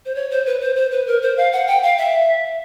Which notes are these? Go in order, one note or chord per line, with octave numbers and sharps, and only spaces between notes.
C5
C#5
C5
B4
C5
C5
B4
A#4
C5
F5
F#5
G5
F5
E5